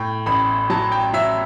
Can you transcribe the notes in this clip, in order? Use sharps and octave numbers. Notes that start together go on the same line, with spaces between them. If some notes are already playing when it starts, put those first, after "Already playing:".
Already playing: A2 G5
A1 B5
F#3 A5
G5
F#3 E5